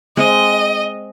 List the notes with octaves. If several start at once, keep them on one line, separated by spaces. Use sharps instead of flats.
G#3 C4 D#5